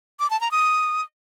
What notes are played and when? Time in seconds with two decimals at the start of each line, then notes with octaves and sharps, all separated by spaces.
0.20 D6
0.30 A5
0.41 A#5
0.51 D#6